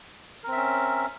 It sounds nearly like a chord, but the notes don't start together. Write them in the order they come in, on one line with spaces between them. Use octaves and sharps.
A#4 C4 E5 C#4